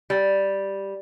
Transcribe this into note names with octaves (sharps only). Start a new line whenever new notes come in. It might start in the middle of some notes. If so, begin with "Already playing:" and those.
G3